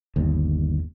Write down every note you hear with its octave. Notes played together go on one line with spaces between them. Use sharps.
G1 D#2